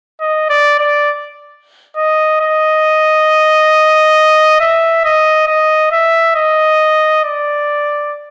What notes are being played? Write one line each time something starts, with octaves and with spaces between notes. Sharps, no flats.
D#5
D5
D5
D#5
D#5
E5
D#5
D#5
E5
D#5
D5